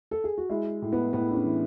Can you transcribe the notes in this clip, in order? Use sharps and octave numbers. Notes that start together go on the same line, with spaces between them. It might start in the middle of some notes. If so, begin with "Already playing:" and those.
A4
G#4
F#4
G#3 E4
A2
B3
A2 B3
D4
C#4
E3